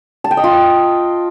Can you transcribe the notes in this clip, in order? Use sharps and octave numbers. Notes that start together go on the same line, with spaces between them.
A5
G5
D#5
F4